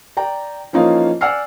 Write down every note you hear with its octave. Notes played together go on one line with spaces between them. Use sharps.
D5 G5 A#5
E3 F3 A#3 C#4 D#4 F4
D5 F#5 G#5 E6 F6 C7